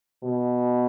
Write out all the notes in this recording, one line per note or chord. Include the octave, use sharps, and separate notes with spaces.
B2